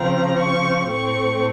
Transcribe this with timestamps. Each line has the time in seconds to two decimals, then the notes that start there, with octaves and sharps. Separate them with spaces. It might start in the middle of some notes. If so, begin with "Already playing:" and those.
Already playing: C#3 F3 C4 A#5
0.40 C#6
0.89 A2 A3 C4 C#6